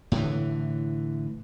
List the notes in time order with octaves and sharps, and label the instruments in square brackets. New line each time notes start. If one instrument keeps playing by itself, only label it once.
[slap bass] A2 D3 E3